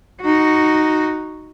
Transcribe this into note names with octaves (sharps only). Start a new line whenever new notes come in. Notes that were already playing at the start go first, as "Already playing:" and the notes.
D#4 F#4